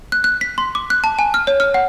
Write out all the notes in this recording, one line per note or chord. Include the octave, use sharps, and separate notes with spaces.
F#6
F#6
B6
C6
D6
F#6
A5
G#5
F6
C#5
F6
F#5